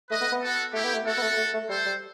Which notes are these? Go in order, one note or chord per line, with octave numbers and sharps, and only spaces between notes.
A3 B4 D#5
B3
B3
F#4 A4
A3 E4 G4
B3
A3
A3 F#4 A4
B3
A3
A3
A3
G3 A4 C5
G3